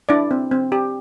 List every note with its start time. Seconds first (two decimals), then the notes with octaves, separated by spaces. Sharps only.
0.09 D4 E4 D5
0.31 C4
0.51 C4
0.72 G4